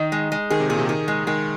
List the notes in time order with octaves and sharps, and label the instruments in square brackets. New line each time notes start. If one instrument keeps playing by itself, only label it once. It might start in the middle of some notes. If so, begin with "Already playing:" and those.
Already playing: [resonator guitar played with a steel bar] D#3 [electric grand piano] D#4
[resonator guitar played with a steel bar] G#3
G#3
[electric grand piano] D#3 [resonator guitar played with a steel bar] G#4
[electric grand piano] C3
[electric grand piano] A#2 [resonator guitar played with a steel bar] G#4
[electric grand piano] C3
[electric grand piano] D#3 [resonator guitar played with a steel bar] G#4
[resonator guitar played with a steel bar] G#3
[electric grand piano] D#3 [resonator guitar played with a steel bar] G#3